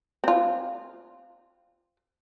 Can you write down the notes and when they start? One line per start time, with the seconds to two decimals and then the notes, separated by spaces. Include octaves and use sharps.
0.24 C4 F4